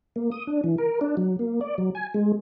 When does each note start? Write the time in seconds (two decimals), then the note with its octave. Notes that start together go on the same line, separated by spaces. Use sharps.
0.16 A#3
0.31 D#6
0.47 D4
0.64 E3
0.78 A#4
1.01 D4
1.17 F#3
1.39 A#3
1.61 D5
1.78 F#3
1.95 G#5
2.14 G#3